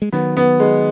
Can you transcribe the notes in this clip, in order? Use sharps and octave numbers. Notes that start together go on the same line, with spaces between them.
G#3
D#3 F#3 B3
B3
G#3